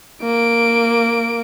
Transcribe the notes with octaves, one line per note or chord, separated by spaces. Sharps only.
A#3 D7